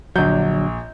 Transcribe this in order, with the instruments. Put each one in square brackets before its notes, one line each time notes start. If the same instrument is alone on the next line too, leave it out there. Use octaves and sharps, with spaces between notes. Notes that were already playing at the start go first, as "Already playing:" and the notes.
[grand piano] A#1 G6 [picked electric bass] D3 F#3